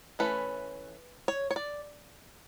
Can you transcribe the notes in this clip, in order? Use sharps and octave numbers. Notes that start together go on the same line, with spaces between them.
E3 A3 C#4 B4
C#5
C#5
D5